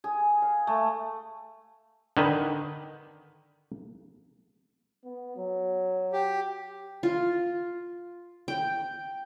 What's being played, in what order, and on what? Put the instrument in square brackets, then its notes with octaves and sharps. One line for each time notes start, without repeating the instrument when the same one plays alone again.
[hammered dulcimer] G#4
F5
A3
[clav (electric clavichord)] D3 D#3 B4
[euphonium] B3
F#3
[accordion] G4
[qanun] F4
G5